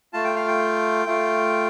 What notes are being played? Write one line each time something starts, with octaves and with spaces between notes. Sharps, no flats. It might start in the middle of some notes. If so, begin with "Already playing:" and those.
A3 F4 A5
G5
F5
G5
A3 F4